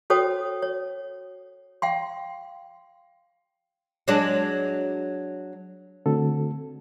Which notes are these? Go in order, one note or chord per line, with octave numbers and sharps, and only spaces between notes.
F#4 A4 C5 C#5 G5 D#6
C#5
F5 G5 C6
F#3 G#3 D4
D3 A3 C4 F#4 A4